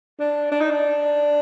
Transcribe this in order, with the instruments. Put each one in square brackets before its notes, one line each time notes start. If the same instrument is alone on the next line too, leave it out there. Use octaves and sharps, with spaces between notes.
[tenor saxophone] D4
D4
D#4
D4